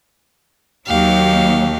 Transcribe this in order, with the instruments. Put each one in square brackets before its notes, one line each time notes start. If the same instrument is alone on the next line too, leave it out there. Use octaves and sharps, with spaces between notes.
[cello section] D#2 F#3 [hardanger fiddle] G4 F5